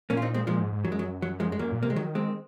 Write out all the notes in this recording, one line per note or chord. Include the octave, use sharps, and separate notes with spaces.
A#2 A#3 C#4
F4
C4 D#4
G#3 C4
A#2 F3 G#3
G#2
G#2
F#2 F#3
G#3
F#3
F#3
F3 G#3
G#3
F#2 F#3 A#3
A#2
C3 A#3
G#3
D#3 F#3
G#3 C4